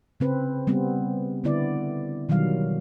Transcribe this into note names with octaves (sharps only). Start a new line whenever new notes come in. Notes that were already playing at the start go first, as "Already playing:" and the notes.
C#3 C4 B4
G3 B3 C4
D3 B3 E4 D5
B2 D#3 F#3 G3 F5